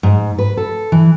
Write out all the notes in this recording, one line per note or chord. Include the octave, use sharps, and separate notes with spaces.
G#2
B4
A4
E3